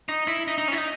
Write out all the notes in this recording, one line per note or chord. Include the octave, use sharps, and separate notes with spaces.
D#4
E4
D#4
D#4
C#4
E4
D#4